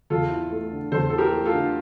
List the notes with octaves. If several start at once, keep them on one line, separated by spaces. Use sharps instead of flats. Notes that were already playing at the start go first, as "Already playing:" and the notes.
E2 F4 A4
E4
A3
D3
E2 A4 C5
E4 A4
G4 A#4
A3
F4 A4
D3